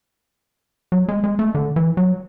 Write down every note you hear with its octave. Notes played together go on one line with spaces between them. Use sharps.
F#3
G#3
G#3
A3
D3
E3
F#3